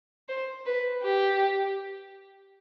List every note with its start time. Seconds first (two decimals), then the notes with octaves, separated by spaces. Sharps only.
0.29 C5
0.66 B4
1.03 G4